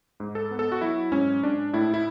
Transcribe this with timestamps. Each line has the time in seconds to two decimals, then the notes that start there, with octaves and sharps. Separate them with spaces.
0.20 G#2
0.35 A4
0.51 B3
0.59 A4
0.72 F#4
0.81 F#3 E4
1.12 G#2 C#4
1.43 G#2 D4
1.73 A2 E4
1.94 E4